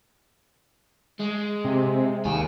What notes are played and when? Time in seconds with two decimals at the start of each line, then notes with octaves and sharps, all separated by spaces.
1.20 G#3
1.64 C3
2.25 D#2 F5 G#5